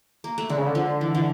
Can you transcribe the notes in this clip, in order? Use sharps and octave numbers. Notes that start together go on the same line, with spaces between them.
A#3
A3
D3 G#3
C#3
D3
F3
E3
D3 E3